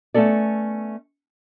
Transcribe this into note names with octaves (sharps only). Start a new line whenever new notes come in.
A3 B3 C#4 A4 D5